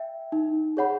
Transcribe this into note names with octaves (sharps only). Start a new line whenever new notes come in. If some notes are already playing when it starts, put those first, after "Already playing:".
Already playing: E5 G5
D#4
G#4 C#5 F#5 B5